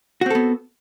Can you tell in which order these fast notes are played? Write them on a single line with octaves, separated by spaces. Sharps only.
F#4 C4 A4 B3